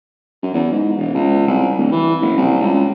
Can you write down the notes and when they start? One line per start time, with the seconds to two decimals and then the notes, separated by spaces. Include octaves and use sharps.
0.42 F#2
0.54 E2
0.72 G#2
0.98 E1
1.14 C#2
1.47 C2
1.78 D1
1.92 E3
2.22 F#1
2.37 C2
2.60 C#2